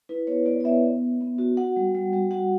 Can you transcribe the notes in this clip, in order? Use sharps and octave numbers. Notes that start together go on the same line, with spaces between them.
E4 B4
B3 C#5
B3 D5
D5
B3 E5
B3
B3
B3
F#4
F#4 F#5
G3
G3
G3
F#4 F#5